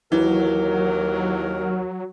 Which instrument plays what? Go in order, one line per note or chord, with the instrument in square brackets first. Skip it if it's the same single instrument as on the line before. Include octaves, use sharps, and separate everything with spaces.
[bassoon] D#2 [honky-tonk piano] E3 [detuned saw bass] F#3 [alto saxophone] A#4